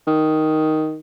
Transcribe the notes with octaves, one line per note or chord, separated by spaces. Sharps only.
D#3